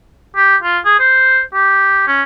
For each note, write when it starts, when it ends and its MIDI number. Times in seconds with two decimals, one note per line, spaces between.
0.36 0.56 67
0.63 0.79 65
0.85 0.98 68
1.00 1.41 72
1.54 2.07 67
2.08 2.23 61